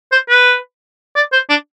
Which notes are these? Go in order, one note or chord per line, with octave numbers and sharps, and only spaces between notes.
C5
B4
D5
C5
D4